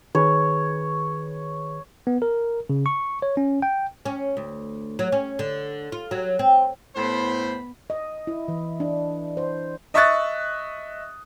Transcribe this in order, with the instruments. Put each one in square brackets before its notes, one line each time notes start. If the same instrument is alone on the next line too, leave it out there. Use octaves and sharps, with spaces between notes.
[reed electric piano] D#3 G#4 B4 [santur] C#5
[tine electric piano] B3
A#4
C#3
C#6
C#5
C#4
G5
[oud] C#4
D2
F#3
C#4
D3
F4
F#3
C4
[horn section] A2 C5 [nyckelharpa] B3 B5
[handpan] D#5
E4
E3
D4
C5
[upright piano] D#5 E5 C#6 D#6 F#6 A6